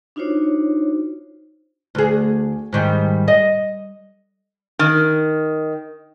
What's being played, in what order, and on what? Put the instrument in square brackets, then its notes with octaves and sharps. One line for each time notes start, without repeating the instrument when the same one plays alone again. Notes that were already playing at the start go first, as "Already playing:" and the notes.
[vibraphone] D4 D#4 F4 F#4 C5 C#5
[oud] D2 G#4
G#2 D#3 G3
D#5
[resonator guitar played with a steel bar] D#3